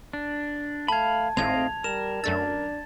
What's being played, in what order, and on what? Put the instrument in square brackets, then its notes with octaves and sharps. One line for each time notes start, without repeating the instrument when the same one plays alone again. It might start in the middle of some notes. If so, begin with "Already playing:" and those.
[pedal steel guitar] D4
[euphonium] A3 [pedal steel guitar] F5 B5 [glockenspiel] A5 G#6
[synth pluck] G#1 A2 [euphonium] A3 [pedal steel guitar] C4 D#5 F5 [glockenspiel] G#6 F7
[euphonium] G3 [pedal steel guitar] A#4 [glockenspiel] E7
[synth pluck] F#2 A3 E6 [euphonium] D4 [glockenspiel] A6